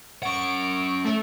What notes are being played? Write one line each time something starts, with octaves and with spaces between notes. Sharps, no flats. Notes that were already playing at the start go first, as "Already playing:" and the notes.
C#4 F#5 C#6 D7
A3